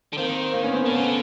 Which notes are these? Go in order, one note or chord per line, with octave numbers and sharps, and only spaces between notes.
D3
D#3 A#3 C4
A#3 C4
B3 C#4
A#3 C4
D3 B3 C#4
C#3
D3